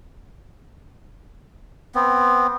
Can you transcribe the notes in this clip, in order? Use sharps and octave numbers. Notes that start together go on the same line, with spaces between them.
B3 C4